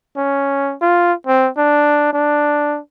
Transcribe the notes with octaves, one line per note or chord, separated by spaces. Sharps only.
C#4
F4
C4
D4
D4